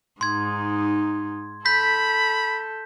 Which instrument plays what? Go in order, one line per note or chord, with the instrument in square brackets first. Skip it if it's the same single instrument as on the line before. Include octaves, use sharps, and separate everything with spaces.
[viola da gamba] G#2 D#4 [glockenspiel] C6 G#6
[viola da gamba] A4 [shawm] B5 [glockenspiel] G6 B6